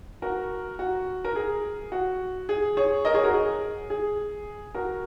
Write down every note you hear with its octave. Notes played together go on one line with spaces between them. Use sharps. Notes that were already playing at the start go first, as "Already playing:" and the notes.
F#4 A#4
F#4
A#4
G#4
F#4
G#4
G#4 C#5
A#4 D#5
G#4 C#5
F#4 A#4
G#4
G#4
F#4 A#4